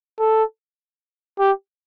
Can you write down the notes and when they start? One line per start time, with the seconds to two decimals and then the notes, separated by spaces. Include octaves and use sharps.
0.19 A4
1.39 G4